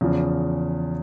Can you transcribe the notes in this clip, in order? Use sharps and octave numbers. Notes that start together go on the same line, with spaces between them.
E2 C#3 F3